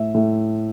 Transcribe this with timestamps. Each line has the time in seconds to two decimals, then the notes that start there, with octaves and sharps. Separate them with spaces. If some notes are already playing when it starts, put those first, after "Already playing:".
Already playing: A2 E5
0.14 A2